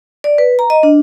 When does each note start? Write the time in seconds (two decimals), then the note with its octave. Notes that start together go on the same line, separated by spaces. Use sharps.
0.24 D5
0.38 B4
0.59 A#5
0.70 D#5
0.83 D4